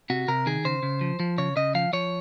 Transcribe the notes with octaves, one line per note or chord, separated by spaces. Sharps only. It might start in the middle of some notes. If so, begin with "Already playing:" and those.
C3 F#4
C3 A#4
D#3 G#4
C#3 C5
C#3
F3
F3
C#3 C#5
C#3 D#5
F3 F5
F3 C#5